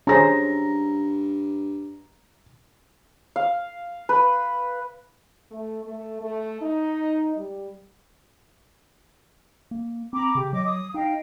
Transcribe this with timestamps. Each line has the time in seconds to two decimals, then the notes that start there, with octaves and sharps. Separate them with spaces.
0.07 G2 C#4 G#4 C5 A#5 A#6
3.36 F5
4.09 B4
5.51 A3
5.84 A3
6.21 A3
6.61 D#4
7.36 G3
9.71 A#3
10.13 C4 A#5 B5 D6
10.35 C#3 G4
10.53 F#3 D#5 D6
10.66 D#6
10.94 D#4 D#5 F5 G5